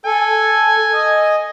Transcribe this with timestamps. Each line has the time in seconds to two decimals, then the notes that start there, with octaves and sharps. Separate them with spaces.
0.06 A4 G#5
0.93 D#5